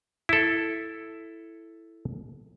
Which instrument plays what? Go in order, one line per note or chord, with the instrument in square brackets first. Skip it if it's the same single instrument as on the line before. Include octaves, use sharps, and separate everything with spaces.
[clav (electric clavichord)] E4 A4